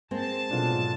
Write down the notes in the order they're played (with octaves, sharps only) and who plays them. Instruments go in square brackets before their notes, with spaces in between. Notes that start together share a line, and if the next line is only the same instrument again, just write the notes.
[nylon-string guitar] G#3 A#3 C4 [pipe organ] A5
[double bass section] G#2 B2 F#3 [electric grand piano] D4 F4 A4